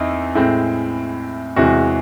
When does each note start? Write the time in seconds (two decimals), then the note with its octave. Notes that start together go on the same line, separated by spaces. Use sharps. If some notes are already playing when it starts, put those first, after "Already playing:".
Already playing: E2 C4 D#4 E4
0.35 A2 G#3 C4
1.56 E2 C3 E3 G#3 F#4